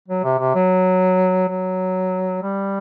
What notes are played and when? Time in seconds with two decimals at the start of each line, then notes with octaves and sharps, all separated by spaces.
0.08 F#3
0.23 C3
0.39 C3
0.55 F#3
1.48 F#3
2.43 G3